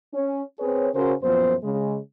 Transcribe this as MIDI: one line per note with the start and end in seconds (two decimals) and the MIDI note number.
0.13 0.41 61
0.59 0.88 60
0.59 0.88 68
0.59 0.88 71
0.59 0.88 73
0.94 1.14 49
0.94 1.14 61
0.94 1.14 66
0.94 1.14 70
0.94 1.14 72
1.23 1.55 42
1.23 1.55 46
1.23 1.55 53
1.23 1.55 59
1.23 1.55 72
1.63 1.97 49
1.63 1.97 56